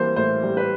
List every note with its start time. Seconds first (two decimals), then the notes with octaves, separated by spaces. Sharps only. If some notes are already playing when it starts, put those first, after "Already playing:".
Already playing: E3 G3 A#3 C5
0.16 A2 C5
0.43 G3
0.57 B4